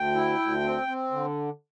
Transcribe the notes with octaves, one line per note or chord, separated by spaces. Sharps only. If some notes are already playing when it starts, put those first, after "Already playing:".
Already playing: D2 G5
E4
D2
C4
C4
D3